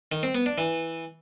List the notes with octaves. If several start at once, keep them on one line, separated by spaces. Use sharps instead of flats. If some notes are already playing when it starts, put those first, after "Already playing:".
D#3
C4
B3
D4
E3